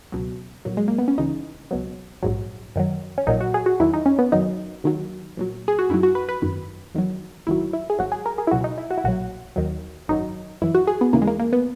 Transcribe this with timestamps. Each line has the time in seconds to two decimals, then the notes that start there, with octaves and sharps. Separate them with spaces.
0.12 C#2 B2 F#3
0.65 B1 A#2 F#3
0.77 G#3
0.88 A#3
0.98 B3
1.08 C#4
1.18 C#2 C#3 E3 D#4
1.71 C#2 B2 F#3
2.23 A#1 G#2 F#3
2.76 F#2 D#3 F#3
3.18 C#4
3.27 A#1 A#2 F#3 D#4
3.41 F#4
3.54 G#4
3.66 F#4
3.80 E2 D#3 F#3 E4
3.93 D#4
4.06 C#4
4.19 B3
4.32 F#2 D#3 F#3 D#4
4.84 D#2 D#3 F#3
5.37 A#1 A#2 F#3
5.68 G#4
5.79 F#4
5.89 F#2 D#3 F#3 E4
6.03 F#4
6.15 B4
6.29 B4
6.42 G#1 F#2 D#3
6.94 E2 D#3 F#3
7.47 G#1 F#2 D#3 F#3 E4
7.73 E4
7.90 G#4
7.99 G#1 G#2 F#3 F#4
8.12 G#4
8.26 A#4
8.38 G#4
8.47 E4
8.51 C#2 B2 F#3 F#4
8.64 D#4
8.78 E4
8.91 F#4
8.98 E4
9.04 B1 A#2 F#3 F#4
9.56 D#2 D#3 F#3
10.08 G#1 F#2 D#3 F#3 D#4
10.62 F#2 E3 E4
10.75 F#4
10.87 G#4
11.01 B3
11.13 D#2 C#3 E3 A#3
11.22 G#3
11.27 A#3
11.40 A#3
11.53 B3